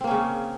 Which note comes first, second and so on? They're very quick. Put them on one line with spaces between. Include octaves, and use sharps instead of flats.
C4 A#3 C#4 C#3